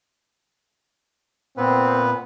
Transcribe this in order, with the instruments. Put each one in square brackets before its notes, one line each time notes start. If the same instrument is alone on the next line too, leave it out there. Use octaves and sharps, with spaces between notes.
[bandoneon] A#2 B3 B4 [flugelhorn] C4